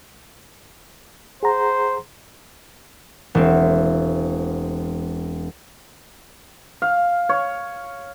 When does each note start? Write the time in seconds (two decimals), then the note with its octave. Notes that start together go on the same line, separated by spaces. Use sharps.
1.43 G#4 C5 F#5 A#5
3.35 E1 C4
6.82 F5
7.29 C#5